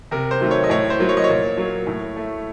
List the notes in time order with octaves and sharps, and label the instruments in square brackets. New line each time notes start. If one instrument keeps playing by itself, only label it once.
[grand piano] C3 A#4
C5
D#3 F#3 A3
C#5
D#5
A2 C#5
C5
F#3 A#3
C#5
D#5
C#5
A#2
F#3 A#3
A2
A3